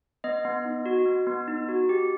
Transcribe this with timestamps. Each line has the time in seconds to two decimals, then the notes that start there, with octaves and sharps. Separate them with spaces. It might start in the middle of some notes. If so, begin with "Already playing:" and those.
0.24 B3 D#5
0.45 B3
0.65 D#4
0.86 F#4
1.06 B3
1.27 B3
1.48 D#4
1.69 F#4
1.89 G4